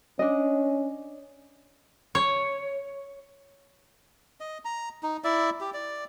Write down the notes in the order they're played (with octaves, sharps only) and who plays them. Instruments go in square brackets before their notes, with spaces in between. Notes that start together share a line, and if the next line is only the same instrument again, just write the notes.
[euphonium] C#4 [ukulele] D4 D#5
[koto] C#5
[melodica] D#5
A#5
D#4
E4 D5 E5
G4
D5